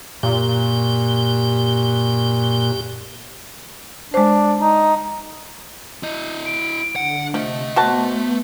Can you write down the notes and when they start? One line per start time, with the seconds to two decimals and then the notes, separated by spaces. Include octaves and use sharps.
0.23 F#2 A#2 G4
4.14 G#3 D4 C5
4.61 D#4
6.03 E4 D#5
6.45 D7
6.96 D3 F#5
7.34 C3 F3 A3 D#5
7.76 B3 F#4 C5 A5